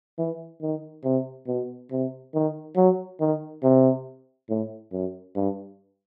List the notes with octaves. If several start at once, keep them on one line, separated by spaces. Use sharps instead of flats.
E3
D#3
C3
B2
C3
D#3
F#3
D#3
C3
A2
F#2
G2